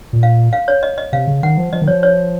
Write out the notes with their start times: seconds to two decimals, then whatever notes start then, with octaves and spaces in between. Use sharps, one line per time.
0.13 A#2
0.23 F5
0.53 F5
0.68 C#5
0.83 D#5
0.98 D#5
1.13 C3 F5
1.27 C#3
1.43 D#3 F#5
1.57 F3
1.73 F3 D#5
1.82 D#3
1.88 F3 C#5
2.03 C#5